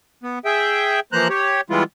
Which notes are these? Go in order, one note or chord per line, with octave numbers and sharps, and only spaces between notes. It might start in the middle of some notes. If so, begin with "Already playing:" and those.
B3
G#4 E5 G5
E3 F3 A#3 C5 A#5 F#6
G4 C#5
E3 G3 G#3 B3 E4 F4